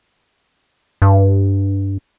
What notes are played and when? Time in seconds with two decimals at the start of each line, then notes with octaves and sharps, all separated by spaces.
1.02 G2